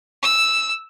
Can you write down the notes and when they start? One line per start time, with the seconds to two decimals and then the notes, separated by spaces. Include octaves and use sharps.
0.22 E6